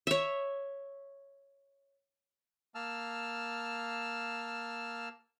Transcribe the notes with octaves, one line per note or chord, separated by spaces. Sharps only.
C#5 E5
A#3 A5 E6 F6